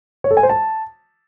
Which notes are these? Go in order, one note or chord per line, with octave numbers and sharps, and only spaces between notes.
C#5
A4
G#5
C5
A5